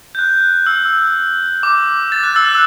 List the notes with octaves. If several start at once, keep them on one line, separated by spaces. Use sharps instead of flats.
G6
F#6
E6
D6
A6
F#6
E6
F#6